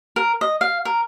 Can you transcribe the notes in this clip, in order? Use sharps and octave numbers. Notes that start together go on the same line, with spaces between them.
A#4
D#5
F5
A#4